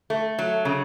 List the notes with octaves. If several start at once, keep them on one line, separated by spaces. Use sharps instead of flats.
A3
F#3
C#3